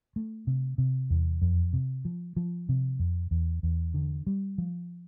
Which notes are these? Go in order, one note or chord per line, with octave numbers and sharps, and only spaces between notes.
A3
C3
C3
E2
F2
C3
F3
F3
C3
F2
E2
E2
D3
G3
F3